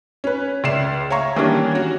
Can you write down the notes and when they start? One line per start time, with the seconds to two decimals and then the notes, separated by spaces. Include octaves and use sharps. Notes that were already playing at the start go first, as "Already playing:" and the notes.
0.24 C#4 B4
0.64 C#2 D5 E5 C7 E7
1.10 C#5 E5 F5 A#5 C#6
1.36 D#3 E3 G3 A#3 C#4 D4
1.75 C#4 F#4